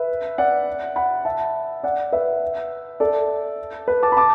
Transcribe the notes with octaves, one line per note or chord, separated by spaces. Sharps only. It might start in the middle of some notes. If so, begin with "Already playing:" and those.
Already playing: B4 E5
D5 F#5
F#5 B5
E5 A5
D5 F#5
B4 E5
A4 D5
B4
A5 D6
B5
A5 D6